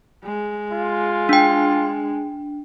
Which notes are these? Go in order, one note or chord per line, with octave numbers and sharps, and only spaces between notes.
G#3
F4
D4 G5